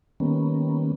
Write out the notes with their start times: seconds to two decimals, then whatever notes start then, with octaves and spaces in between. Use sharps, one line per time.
0.20 D#3 G3 A#3 B3 C#4